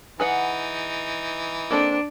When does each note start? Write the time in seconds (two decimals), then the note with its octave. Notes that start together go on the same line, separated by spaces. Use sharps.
0.20 E3 D#4 G#4 B4 F#5
1.71 A#3 C4 D4 A4